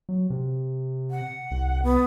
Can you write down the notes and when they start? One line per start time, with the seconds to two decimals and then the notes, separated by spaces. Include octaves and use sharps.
0.09 F#3
0.30 C3
1.11 F#5
1.51 C2
1.83 B3